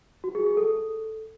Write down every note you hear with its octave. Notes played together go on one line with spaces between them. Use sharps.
F#4
G#4
G#4
A4